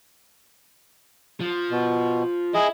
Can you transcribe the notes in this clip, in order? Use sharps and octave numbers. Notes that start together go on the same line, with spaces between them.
F3
B2
E4 G#4 D#5